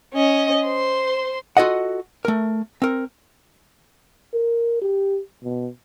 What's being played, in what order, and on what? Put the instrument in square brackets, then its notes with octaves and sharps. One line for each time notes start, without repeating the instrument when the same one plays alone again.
[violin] C#4 D#5
C5 C6
[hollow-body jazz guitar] F4 F#4 A4 D#5 F#5
A3 A#4
C4 A#4
[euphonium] A#4
G4
B2